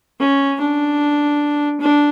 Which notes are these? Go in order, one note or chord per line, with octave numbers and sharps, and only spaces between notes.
C#4
D4
D4